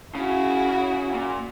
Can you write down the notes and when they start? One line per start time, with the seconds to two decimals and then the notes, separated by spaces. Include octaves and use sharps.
0.15 C#3 E4 F#4
1.14 A#2